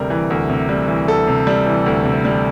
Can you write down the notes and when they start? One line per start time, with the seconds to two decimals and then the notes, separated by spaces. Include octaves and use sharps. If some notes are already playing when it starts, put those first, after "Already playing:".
Already playing: D2 C3 G3 A#4
0.10 E3
0.30 D2
0.50 C3
0.69 G3
0.88 E3
1.08 D2 A4
1.27 C3
1.47 G3
1.66 E3
1.86 D2
2.05 C3
2.25 G3